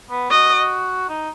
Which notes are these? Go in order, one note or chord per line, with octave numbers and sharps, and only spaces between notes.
B3
F#4 D#5
D#4